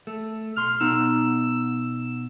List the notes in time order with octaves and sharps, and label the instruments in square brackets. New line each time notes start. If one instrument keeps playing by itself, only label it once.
[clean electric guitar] A3
[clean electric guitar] B1 C6 [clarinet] F6
[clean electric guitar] B2 B3 D#4 [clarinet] E6